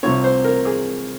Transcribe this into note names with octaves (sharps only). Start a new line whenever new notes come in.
C2 C3 F3 C4 C#5
C5
A#4
G#4